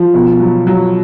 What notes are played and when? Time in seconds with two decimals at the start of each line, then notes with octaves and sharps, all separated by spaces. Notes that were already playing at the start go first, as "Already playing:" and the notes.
Already playing: F3
0.14 B2
0.40 F#3
0.67 F#3